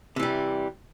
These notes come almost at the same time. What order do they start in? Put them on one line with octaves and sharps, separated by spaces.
C3 E3 G3